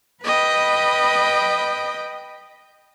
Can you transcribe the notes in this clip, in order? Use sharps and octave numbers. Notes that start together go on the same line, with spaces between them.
B4 D#5 G5 B5